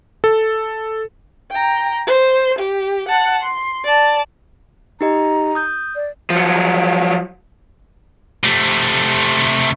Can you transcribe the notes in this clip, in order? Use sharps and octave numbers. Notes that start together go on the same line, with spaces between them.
A4
G5 A#5
C5
G4
F#5 A5
C6
D5 A5
D#4 G4 D#5 A#5
D#6 G6
D5
F3 F#3
C3 A3